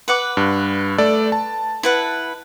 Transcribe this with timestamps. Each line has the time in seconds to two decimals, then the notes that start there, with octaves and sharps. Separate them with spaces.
0.08 B4 F#5 D6
0.37 G2
0.98 A3 A4 D5
1.32 A5
1.83 E4 B4 F#5